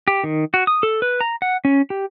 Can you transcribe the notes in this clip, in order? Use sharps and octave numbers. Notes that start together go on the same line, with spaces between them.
G4
D#3
F#4
D#6
A4
B4
A#5
F#5
C#4
G4